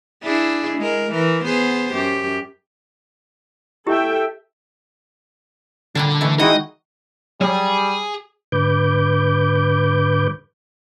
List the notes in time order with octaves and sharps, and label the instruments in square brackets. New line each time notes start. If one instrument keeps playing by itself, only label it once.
[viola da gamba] D4 E4 G#4
G#3 A#4
E3 A#4
B3 G#4 C5
F#2 G4
[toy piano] E4 G4 [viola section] A4 E5 G5
[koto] A#2 G3 D4 [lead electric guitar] D3
[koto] E3 A3
[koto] D#3 F#4 A#5 [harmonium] G#3 D#4 E4 [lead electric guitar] D#5
[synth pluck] F#3 [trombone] G3 [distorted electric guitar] G#4
[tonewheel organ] G#2 D3 B4 D6 G6